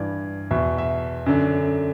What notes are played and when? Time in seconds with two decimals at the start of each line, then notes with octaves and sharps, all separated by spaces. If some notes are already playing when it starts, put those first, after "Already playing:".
Already playing: G2 E3 D5
0.51 E2 B2 E5
0.78 E5
1.26 F#2 D3